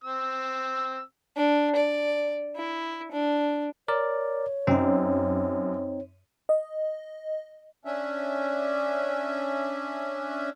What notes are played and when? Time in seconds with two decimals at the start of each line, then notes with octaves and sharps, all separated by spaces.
0.04 C4 E6
1.36 D4
1.76 D5
2.56 E4
3.12 D4
3.88 A#4 C#5 D5
4.67 F#2 C4 D#4
6.49 D#5
7.85 C#4 D4 E5